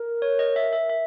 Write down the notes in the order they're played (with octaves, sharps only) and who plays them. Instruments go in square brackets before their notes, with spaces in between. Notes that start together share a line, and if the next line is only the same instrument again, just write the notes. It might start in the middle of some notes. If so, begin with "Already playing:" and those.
Already playing: [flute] A#4
[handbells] C#5
D#5
E5
E5
E5